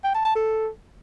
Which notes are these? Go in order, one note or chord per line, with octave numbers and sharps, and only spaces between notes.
G5
A5
A5
A4